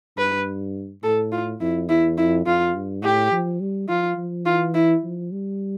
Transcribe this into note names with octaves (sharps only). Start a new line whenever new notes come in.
G2 B4
A2 A4
F4
F2 E4
E2 E4
F2 E4
F2 F4
G2
A2 G4
F3
G3
F3 F4
F3
E3 F4
E4
F3
G3